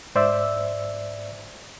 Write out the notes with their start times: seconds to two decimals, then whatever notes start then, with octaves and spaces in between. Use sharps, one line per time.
0.15 G#2 C5 D5 E5 E6